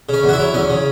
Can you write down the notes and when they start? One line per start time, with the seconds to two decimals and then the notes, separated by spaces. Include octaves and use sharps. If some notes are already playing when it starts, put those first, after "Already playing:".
0.09 C#3 C#4
0.24 E2
0.29 F#4
0.33 E4
0.39 F#3
0.54 E2 C#4
0.70 C#3